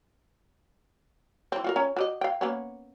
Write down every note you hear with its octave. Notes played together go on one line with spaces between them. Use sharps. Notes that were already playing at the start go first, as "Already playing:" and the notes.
E3 C4
F4 F#4 A#4
C#4 A#5
F#4 G4 D#5
F5 G5
A#3 B3 C#4